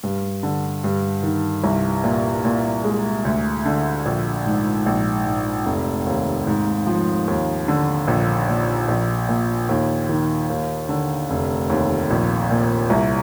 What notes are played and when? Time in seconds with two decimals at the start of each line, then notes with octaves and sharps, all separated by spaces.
0.03 G2
0.43 D3
0.84 G2
1.23 D#3
1.64 C2
2.04 A#2
2.45 A#2
2.84 G#3
3.25 D2
3.65 D3
4.06 A#1
4.46 G#2
4.86 A#1
5.26 G#2
5.66 F1
6.06 D#2
6.47 G#2
6.87 F3
7.28 D#2
7.68 D3
8.08 A#1
8.49 A#2
8.88 A#1
9.29 A#2
9.69 D#2
10.09 D#3
10.50 D#2
10.89 D3
11.30 F1
11.70 D#2
12.10 A#1
12.51 A#2
12.90 C2